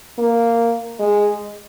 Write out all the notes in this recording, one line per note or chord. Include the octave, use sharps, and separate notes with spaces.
A#3
G#3